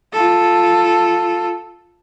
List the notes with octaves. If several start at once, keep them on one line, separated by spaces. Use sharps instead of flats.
F4 A4